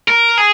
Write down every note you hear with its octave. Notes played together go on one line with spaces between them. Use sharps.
A#4
G#4